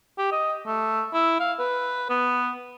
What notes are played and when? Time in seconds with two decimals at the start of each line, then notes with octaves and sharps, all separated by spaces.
0.18 G4
0.32 D#5
0.67 A3
1.14 E4
1.40 F5
1.60 B4
2.10 B3